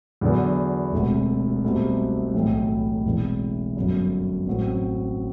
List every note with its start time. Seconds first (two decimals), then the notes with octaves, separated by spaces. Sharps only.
0.21 E2 D3 F#3 B3
0.92 E1 D2 C3
1.64 C2 B2 A3 C4 G4
2.34 B1 A2 E3 A3
3.05 E1 E2 C3 E3
3.76 G1 F#2 F#3
4.46 A1 A2 F#3 C4